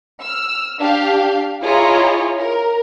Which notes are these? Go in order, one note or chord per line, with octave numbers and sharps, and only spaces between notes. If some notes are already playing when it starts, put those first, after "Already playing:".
E6 F6
D4 G4 F5
E4 F4 G#4 C#5 D#5 A#5
A#4